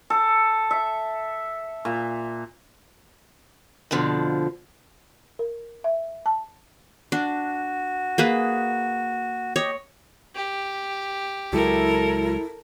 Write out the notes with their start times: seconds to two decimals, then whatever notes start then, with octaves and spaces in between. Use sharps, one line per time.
0.10 A4
0.71 E5
1.85 A#2
3.91 F2 B2 D3 F3
5.39 A#4
5.84 E5
6.26 A5
7.12 D4 F#4
8.18 A#3 G#4 B4
9.56 G4 C#5 D#5
10.35 G4
11.53 C#2 F#3 G#3 E4 A4 A#4